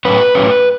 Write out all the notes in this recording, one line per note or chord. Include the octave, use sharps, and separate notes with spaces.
A2 F#3 C#4 B4
A2 F#3 C#4